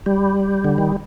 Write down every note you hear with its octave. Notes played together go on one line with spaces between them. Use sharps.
G3
D3
D#3